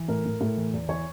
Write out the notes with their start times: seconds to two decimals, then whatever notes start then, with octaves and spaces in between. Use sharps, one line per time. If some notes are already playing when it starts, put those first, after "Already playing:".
Already playing: E3
0.08 A2 A#4
0.26 A2
0.41 A2
0.57 E3
0.73 E2
0.88 E3 C#5